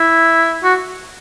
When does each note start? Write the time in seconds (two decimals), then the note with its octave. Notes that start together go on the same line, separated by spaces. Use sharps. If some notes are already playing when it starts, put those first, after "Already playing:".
Already playing: E4
0.64 F#4